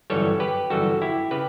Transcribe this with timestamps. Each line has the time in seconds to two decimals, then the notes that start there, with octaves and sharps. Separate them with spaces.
0.10 G1 F#2 E3 G3 A4 C#5
0.40 G4 B4
0.70 G1 F#2 E3 G3 F#4 A4
1.02 E4 G4
1.31 C#3 G4 B4